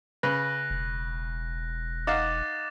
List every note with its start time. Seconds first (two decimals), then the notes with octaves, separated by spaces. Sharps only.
0.23 C#3 B4 F#6 A#6
0.70 E1
2.07 D#4 F5 F#5 D6 A6 E7